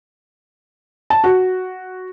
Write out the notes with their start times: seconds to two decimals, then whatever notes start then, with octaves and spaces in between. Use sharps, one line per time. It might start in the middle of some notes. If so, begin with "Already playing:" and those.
1.10 A5
1.24 F#4